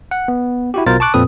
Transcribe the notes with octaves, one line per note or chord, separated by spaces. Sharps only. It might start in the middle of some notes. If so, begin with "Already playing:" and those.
F#5
B3
E4 F#4 G4
B1 B2 F4 A#4 C5 A6
A5 C#6 D6 F#6
F2 A#2 C4 A4 B4 D#6